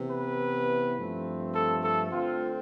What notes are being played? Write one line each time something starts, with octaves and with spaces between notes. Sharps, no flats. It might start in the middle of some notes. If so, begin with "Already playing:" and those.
Already playing: C3 E3 B3
B4
G2 F3 A3 C4
A4
A4
D3 A3 C4 F4